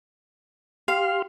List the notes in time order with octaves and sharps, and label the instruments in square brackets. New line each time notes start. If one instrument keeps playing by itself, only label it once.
[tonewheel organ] G4 C6 F6 [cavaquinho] F5